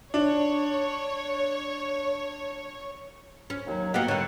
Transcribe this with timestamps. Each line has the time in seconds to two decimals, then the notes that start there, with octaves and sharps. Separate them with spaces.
0.14 D4 C#5
3.50 C#4
3.67 D#2 F#3
3.94 A#3 B3 F#4 G4 D#5 F#5
4.08 D3 G3 A#4 C#5 F#5